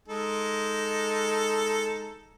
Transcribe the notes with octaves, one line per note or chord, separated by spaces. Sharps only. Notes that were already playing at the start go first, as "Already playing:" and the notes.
G#3 D#4 A4